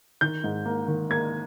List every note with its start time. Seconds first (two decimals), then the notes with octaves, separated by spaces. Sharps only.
0.21 D#3 G6
0.44 G#2
0.65 A#3
0.88 D#3
1.10 A#3 G#6